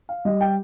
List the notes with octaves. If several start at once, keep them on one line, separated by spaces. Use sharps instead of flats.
F5
G3 D#5
G5